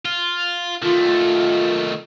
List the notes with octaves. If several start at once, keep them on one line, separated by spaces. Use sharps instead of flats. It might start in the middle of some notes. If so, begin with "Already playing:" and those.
F4
D#3 A3 F4